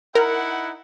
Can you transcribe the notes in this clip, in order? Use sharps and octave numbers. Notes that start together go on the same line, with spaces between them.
D#4 E4 A#4 F#5